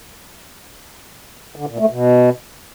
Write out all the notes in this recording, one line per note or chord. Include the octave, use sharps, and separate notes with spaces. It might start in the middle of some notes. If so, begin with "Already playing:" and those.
D3
A#2
A3
B2